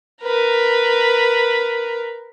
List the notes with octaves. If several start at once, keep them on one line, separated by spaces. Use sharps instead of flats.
A#4 B4